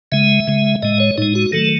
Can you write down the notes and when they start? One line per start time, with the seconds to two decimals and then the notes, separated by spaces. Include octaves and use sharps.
0.12 C#3 G#3 E5
0.47 C#3 G#3
0.82 A2 G#3 D#5
1.00 C#5
1.18 A2 G#3 D#4
1.35 F#4
1.52 D#3 F#3 A3 A4